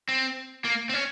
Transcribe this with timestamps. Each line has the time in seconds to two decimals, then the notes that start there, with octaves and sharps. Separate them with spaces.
0.09 C4
0.65 A#3
0.89 C4
0.94 C#4